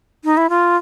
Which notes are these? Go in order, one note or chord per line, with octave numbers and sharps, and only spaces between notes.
D#4
E4
F4